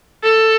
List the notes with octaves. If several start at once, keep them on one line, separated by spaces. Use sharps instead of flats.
A4